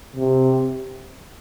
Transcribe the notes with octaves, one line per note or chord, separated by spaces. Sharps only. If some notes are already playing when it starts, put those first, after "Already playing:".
C3